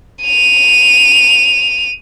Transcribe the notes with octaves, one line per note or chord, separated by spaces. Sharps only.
D#7 F7